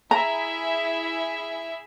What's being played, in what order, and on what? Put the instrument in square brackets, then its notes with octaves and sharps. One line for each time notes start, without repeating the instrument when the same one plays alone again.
[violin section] E4 G#4 E5 [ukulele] A#5